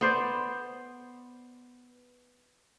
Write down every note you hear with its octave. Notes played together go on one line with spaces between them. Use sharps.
B3 C5 D5